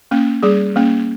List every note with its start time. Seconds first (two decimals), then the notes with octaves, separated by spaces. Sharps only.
0.11 A#3 C#4
0.43 G3 G#4
0.76 A#3 C#4